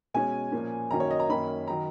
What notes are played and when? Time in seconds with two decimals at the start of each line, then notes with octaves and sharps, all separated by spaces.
0.14 B2 G#3 C#4 G#5
0.52 A#2 F3 A#3 C#4
0.91 F#2 D#3 F#3 A#3 C#4 A#5
1.00 C#5
1.11 D#5
1.20 A#5
1.30 F#2 D#3 A#3 C#4 B5
1.68 D#3 F#3 A#5